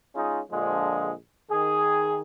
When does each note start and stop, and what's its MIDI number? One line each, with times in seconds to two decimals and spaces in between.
0.14 0.40 56
0.14 0.40 61
0.14 0.40 63
0.14 0.40 65
0.14 0.40 68
0.51 1.12 34
0.51 1.12 50
0.51 1.12 53
0.51 1.12 56
1.50 2.19 51
1.50 2.19 68